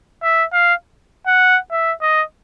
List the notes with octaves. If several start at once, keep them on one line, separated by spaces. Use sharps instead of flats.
E5
F5
F#5
E5
D#5